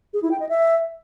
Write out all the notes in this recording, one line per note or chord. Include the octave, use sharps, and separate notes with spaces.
G#4
E4
G5
D#5
E5